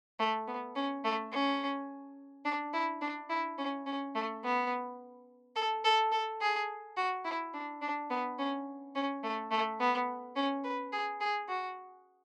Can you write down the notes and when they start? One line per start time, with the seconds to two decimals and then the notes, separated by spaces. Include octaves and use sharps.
0.19 A3
0.48 B3
0.76 C#4
1.05 A3
1.32 C#4
2.45 D4
2.73 E4
3.02 D4
3.29 E4
3.58 C#4
3.86 C#4
4.15 A3
4.44 B3
5.56 A4
5.85 A4
6.12 A4
6.41 G#4
6.97 F#4
7.25 E4
7.54 D4
7.82 D4
8.10 B3
8.39 C#4
8.95 C#4
9.24 A3
9.51 A3
9.80 B3
10.36 C#4
10.64 B4
10.92 G#4
11.21 G#4
11.48 F#4